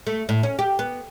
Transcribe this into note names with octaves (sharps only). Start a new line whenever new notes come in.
A3
A2
C#4
G4
B3